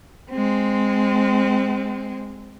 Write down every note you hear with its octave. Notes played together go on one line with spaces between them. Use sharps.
G#3 C4